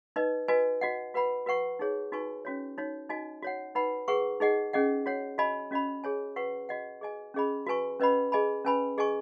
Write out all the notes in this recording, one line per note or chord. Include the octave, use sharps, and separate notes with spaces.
D#4 B4 D#5
F#4 B4 D#5 G#5
F#4 D#5 F#5
F#4 B4 F#5 B5
F#4 B4 F#5 C#6
D#4 G#4 C#5
D#4 F#4 B4 G#5 C#6
C#4 F#4 C#5
D#4 F#4 C#5
D#4 F#4 D#5 G#5
F#4 C#5 F#5
D#4 B4 F#5 B5
G#4 B4 F#5 C#6
D#4 G#4 D#5 F#5
C#4 G#4 D#5 F#5
F#4 C#5 F#5
F#4 D#5 G#5 B5
C#4 F#4 D#5 B5
G#4 C#5 G#5
F#4 B4 F#5 C#6
F#4 D#5 F#5
G#4 D#5 G#5
C#4 G#4 D#5 B5
F#4 B4 G#5 C#6
C#4 B4 D#5 F#5 B5
G#4 D#5 G#5 B5
C#4 B4 G#5 B5
G#4 D#5 G#5 C#6